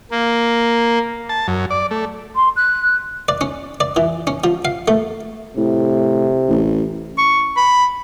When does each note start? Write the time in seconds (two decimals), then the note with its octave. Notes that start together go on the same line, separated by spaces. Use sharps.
0.11 A#3
1.29 A5
1.48 F#2
1.71 D5
1.91 A3
2.36 C6
2.56 F#6
3.29 D5
3.41 C#4
3.80 D5
3.96 E3
4.27 C#4
4.44 F3
4.65 F5
4.88 A3
5.57 A2 C3
6.48 A1
7.18 C#6
7.57 B5